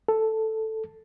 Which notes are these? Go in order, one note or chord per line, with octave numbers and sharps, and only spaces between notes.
A4